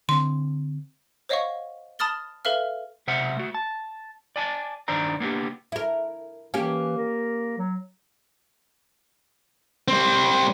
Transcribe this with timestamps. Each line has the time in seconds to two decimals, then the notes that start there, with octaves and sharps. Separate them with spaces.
0.09 D3 C4 C6
1.29 C5 C#5 D#5 F5 F#5 C#6
1.99 A5 B5 D#6 F6 A6 G7
2.45 A4 B4 E5 F5 F6
3.07 B1 C3 C5 E5 F#5
3.37 A3 F#4
3.54 A5
4.36 D5 G#5 A5
4.88 G2 D#3 D4 C5 D5 A#5
5.20 A#3 B3 D4 F#4 G4
5.72 E4 A#4
6.54 E3 A#3 C#4 G4
6.97 A#4
7.58 F#3
9.88 G3 C4